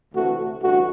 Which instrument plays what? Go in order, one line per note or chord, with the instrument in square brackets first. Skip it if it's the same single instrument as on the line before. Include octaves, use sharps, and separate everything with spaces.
[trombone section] D2 C3 E3 A3 F#4
A1 G2 D3 A3 F#4